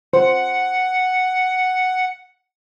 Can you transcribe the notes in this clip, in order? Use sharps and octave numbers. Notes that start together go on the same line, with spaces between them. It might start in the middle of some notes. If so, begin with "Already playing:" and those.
C5 F#5